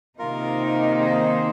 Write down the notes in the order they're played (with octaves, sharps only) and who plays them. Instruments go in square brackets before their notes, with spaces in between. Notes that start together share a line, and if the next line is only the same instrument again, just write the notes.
[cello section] C3 D#3 A#3 D#4 [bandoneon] F4 A#4
[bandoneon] G#4 C5